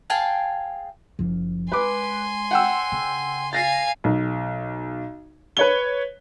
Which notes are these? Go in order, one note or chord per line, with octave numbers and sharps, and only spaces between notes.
G#4 F5 G5 A5
F#1 F3
G#3 B4 G#5 C6 D6
F#5 G5 E6
C#3
F5 G#5 A6 A#6 C7
B1
B4 C#5 G7